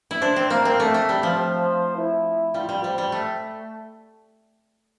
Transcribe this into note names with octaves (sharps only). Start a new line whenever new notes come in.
E4
D4 C5
C4
A#3 A#4
C4
A3 A4
A3
G3 G4
F3
C5
E4
G3 F4
G3
G3 C5
G3
A3